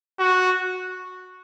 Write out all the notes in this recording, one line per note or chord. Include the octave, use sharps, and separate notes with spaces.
F#4